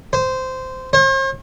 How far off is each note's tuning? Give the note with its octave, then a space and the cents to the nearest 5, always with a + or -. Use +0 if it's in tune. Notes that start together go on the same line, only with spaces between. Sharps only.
C5 -15
C5 +45